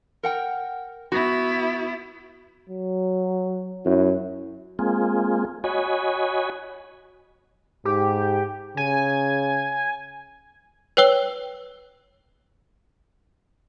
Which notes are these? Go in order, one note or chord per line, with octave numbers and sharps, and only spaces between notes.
A#4 F#5 G5
B3 E4 F#4
F#3
F#2 E4
G#3 A#3 C4 F4 G#4
F#4 C#5 D#5 G#5 B5
G#2 G4
C#3 G#5
B4 C#5 G5 E6 G7